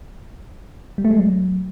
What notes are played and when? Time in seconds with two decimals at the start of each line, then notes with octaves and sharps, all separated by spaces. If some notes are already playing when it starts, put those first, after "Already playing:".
0.98 G3
1.05 A3
1.11 G#3
1.18 F#3